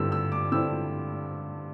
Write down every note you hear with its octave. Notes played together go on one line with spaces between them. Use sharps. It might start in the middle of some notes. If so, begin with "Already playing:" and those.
Already playing: G2 D3 G3 C4 E4 E6
E6
D6
G2 D3 G3 C4 E4 E6